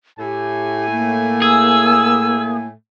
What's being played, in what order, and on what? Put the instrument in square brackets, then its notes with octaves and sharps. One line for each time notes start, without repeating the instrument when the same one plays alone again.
[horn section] A2 A3 G#5 [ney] G4
[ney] A#3
[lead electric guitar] G#4 [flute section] E6